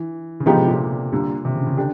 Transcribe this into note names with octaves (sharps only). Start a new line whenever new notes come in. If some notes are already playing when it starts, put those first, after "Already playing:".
Already playing: E3
C#3
D3 F3 G#3 B3 D#4 G4
C3
A#2
D3 G3 A#3
C3
C#3
C#3
D3 D4 G4